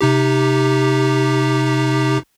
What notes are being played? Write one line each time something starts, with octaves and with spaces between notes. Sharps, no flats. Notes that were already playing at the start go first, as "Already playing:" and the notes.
C3 D#4 G4